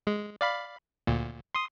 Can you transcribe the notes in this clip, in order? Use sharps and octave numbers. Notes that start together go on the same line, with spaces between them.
G#3
D5 F5 B5
D2 A#2
C6 D#6